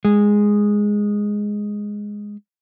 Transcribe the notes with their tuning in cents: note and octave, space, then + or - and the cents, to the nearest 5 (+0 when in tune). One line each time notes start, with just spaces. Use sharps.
G#3 -5